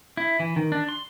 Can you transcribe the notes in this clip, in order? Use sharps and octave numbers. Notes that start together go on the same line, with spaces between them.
E4
E3
D#3
D4
C6